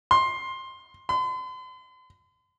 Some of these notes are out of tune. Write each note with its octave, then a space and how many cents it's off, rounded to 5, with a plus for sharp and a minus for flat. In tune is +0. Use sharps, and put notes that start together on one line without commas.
C6 +15
C6 -45